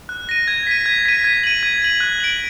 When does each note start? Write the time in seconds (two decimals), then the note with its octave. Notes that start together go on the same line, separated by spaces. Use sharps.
0.09 F#6
0.29 A#6 D#7
0.48 G#6
0.67 B6 D#7
0.86 G#6
1.06 B6 D#7
1.24 G#6
1.44 D#7 F#7
1.63 G#6
1.82 D#7 F#7
2.00 F#6
2.20 D7 F#7